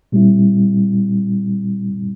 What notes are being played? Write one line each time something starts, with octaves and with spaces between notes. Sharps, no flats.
A#2 G3 C4 E4